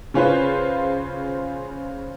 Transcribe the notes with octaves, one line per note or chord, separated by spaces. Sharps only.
C#3 C#4 F4 B4 C5